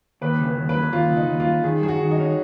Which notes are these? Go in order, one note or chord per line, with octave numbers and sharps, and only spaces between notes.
D#2 B4
C#3
B4
D#2
B4
F#3
D#2 F4
C#3
D#4
D#2
F4
F#3
D#3 G#4
F#3 G#4
F#4
D#3
D#4
C#4